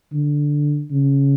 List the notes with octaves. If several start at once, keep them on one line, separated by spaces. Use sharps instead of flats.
D3
C#3